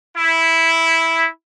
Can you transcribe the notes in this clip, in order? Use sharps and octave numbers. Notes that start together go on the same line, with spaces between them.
E4